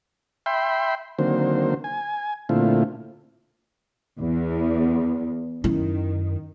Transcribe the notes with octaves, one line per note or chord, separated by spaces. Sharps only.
E5 G5 B5 C6
D3 D#3 F#3 A#3 C4 C5
G#5
A#2 D3 A3 C4 E4 F4
E2
F#2 D#3 E4